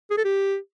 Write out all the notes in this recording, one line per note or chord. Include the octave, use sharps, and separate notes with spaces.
G#4
A4
G4